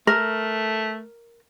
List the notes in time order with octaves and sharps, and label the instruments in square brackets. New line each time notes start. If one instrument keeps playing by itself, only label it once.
[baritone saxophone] A3 [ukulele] A#4